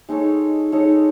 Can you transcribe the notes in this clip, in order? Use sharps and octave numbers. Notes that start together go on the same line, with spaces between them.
G#3 D#4 A4 C#5
G#3 D#4 A4 C#5